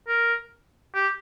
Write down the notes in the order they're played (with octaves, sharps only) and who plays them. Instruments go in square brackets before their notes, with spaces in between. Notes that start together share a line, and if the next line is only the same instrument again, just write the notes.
[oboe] A#4
G4